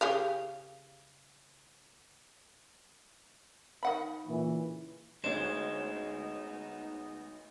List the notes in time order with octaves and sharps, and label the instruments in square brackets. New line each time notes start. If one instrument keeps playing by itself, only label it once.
[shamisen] C#3 G4 F5
D#3 F#5 B5
[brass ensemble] A#2 C#3 E3
[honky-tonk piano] D2 C#4 C5 [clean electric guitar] G#3 [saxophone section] B3 D#4 [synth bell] E7